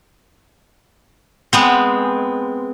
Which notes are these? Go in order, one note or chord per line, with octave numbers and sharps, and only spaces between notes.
G#3 B3 C4